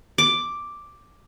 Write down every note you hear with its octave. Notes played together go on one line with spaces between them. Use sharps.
D6